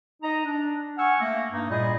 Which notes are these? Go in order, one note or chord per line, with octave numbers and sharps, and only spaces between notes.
D#4 D#5 A#5
D4
F#5 G#5 C#6 E6 F6
A3 A#3
G2 A#3 D#4
A#2 G3 E4 G#4 D#5